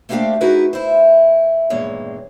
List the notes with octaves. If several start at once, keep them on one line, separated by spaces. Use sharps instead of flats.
A3 A#3 C4 D4 G4 F5
D#4 E4 F#4 G#4 A#4 B4
E4 C5
E2 G2 A#2 D#3 G#3 C#5